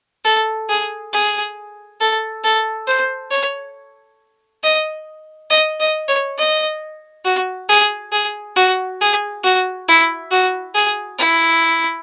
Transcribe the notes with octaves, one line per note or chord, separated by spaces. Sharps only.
A4
G#4
G#4
A4
A4
C5
C#5
D#5
D#5
D#5
C#5
D#5
F#4
G#4
G#4
F#4
G#4
F#4
E4
F#4
G#4
E4